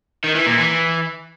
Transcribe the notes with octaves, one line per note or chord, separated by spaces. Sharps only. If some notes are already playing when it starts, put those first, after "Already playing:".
D#3
E3
A#2
E3